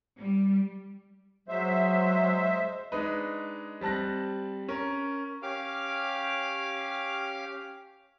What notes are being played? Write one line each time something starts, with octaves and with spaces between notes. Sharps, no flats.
G3
F#3 G#3 C5 E5
G#3 D4 D#4 B4
G3 C4 A5 F#6 A#6
C#4 A#4
C#4 G4 F5 D6 F6